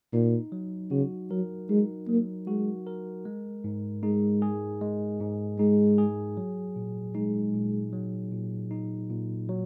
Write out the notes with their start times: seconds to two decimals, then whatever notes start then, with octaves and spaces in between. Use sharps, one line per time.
0.13 A#2 D#4
0.52 F#3
0.91 C#3 F#4
1.30 F#3 A#4
1.69 G#3 D#4
2.08 F#3 A#3
2.47 G#3 F#4
2.87 A#4
3.25 G#3
3.64 G#2
4.03 G#3 D#4
4.42 G#4
4.81 G#3
5.20 G#2
5.59 G#3 D#4
5.98 G#4
6.37 F#3
6.76 A#2
7.15 G#3 D#4
7.54 A#2
7.93 F#3
8.32 A#2
8.71 D#4
9.10 A#2
9.49 F#3